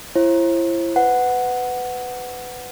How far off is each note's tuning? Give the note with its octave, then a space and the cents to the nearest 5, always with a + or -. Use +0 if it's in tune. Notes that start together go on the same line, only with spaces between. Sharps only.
E4 +35 C5 +40
B4 +20 F#5 +0